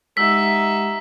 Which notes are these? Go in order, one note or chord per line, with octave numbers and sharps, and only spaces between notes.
G#3 D#4 G4 E5 F#5 E6 B6